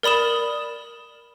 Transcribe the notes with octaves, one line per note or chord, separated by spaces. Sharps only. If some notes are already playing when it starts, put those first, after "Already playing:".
A#4 D5 B5 D#6 E7